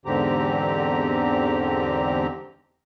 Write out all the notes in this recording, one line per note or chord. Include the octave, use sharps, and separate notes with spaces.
E2 G#2 D3 C4 G4 A#5